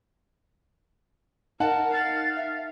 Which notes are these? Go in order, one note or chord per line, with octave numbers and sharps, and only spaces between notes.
D#4 A#4 F#5 A5
F5 A6
E5